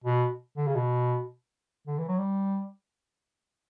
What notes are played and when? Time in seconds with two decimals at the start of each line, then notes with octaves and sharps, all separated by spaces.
0.04 B2
0.57 D3
0.67 C#3
0.75 B2
1.87 D3
1.98 E3
2.08 F#3
2.19 G3